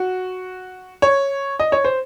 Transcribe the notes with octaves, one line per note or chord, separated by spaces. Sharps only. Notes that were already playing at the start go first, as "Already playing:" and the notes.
Already playing: F#4
C#5
D#5
C#5
C5